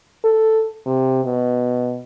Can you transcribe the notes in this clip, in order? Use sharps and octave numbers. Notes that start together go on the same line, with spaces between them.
A4
C3
B2